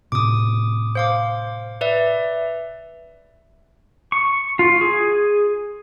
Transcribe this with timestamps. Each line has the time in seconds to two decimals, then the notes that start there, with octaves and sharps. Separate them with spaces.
0.12 A2 C3 D6 D#6
0.95 C5 F5 D6
1.81 B4 D5 E5
4.12 C#6
4.59 F4
4.81 G#4